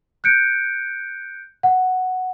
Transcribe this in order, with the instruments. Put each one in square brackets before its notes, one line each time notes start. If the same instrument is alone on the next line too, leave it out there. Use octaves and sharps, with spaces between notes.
[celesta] F#6 G6 C#7 D7
F#5